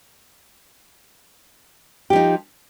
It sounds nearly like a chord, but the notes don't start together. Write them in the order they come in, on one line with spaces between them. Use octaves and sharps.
G4 F3 D#4